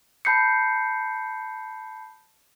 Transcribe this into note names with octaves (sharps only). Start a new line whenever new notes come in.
A5 B5 G6 C7 C#7